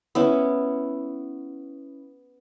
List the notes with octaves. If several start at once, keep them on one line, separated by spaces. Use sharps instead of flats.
B3 C#4 E4